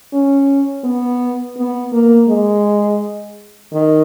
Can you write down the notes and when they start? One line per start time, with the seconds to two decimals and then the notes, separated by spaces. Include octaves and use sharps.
0.13 C#4
0.84 B3
1.57 B3
1.92 A#3
2.28 G#3
3.73 D#3